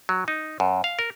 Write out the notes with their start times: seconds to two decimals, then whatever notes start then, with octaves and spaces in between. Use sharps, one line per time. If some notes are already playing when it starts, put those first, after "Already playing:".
0.09 F#3
0.28 D#4
0.60 F#2
0.84 F5
0.99 A#4